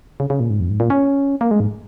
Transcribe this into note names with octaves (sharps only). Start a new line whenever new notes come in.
C#3
C#3
A#2
G#2
F2
G#2
A#2
C#4
A#3
G#3
G#2